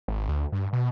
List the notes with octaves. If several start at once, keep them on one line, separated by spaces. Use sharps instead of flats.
G#1
D2
G2
B2